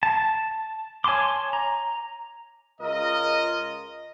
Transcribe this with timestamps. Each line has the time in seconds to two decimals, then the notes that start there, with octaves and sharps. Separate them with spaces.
0.03 A5
1.04 C#5 G#5 A5 C6 D6
1.53 A#5
2.81 C#2 F4 A#4 D#5